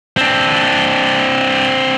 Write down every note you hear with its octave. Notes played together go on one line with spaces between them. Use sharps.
C4 D4